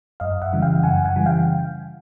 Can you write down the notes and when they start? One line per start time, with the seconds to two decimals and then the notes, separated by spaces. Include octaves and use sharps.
0.20 F#2 D#5 F5
0.42 E5 F#5
0.53 C#3 E3 G3
0.62 F5 G5
0.83 F#2 F#5 G#5
1.05 F#5 G#5
1.16 C#3 E3 G3
1.26 F5 G5